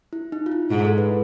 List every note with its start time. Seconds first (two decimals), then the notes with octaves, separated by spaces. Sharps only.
0.13 E4
0.32 D#4
0.46 F4
0.52 E4
0.71 G#2 E4
0.85 A4
0.98 B4